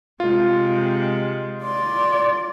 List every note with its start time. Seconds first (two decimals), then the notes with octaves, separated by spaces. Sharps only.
0.20 C3 G#3 F4
1.63 D5 C6